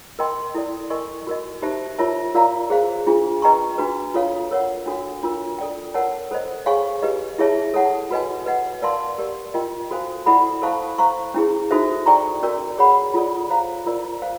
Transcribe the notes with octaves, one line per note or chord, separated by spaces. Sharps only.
A#4 D#5 G5 C6
E4 A4 D5
A#4 D#5 G#5 C#6
F#4 A#4 D#5
D#4 G4 C5 E5 A5
F4 A#4 C#5 E5 A5
F4 A#4 D5 F5 A#5
G#4 C5 F5
D4 F4 G#4
B4 D#5 G5 A#5 C#6
D4 F#4 B4
F4 A4 C#5 F5
A#4 C#5 F#5
D4 F#4 A4
D4 F4 A#4
A4 D5 G5
A#4 C#5 F#5 A5
A4 C5 D#5
G#4 C#5 F5 G#5 C#6
G4 B4 D#5
E4 G#4 C#5 E5 A5
A4 C#5 F#5 A5
F#4 B4 D#5 G#5
B4 D#5 F#5
A#4 D5 F5 A5 C6
G4 A#4 D5
F4 A#4 D#5 G5
F#4 A4 C5 F5 G#5
E4 A4 D5 F#5 B5
A4 C5 F5 A5 C#6
C5 F5 A#5 C#6
C#4 E4 G#4
D#4 F#4 A4 C5 E5
A4 D5 G5 A#5 C#6
C#4 F#4 A#4 D5
G#4 C#5 F#5 B5
F4 A4 D5
C5 F5 A#5
F4 A#4 D5
C5 F5